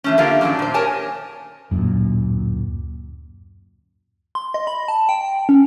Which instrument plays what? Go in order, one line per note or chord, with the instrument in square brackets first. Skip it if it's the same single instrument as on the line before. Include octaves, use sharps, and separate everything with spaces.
[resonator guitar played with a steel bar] E3 A3 C#4
D3 F3 A#3 F4 G4 F5
F#2 D#3 F#3 C#4 D4
A#2 C5
G4 A#4 C#5 G#5 A5
[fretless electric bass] D1 F#2 A#2
[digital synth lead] C6
D#5
B5
A5
G5
C#4